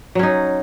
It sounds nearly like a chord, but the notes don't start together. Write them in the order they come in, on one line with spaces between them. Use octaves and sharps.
F#3 C#4 D#4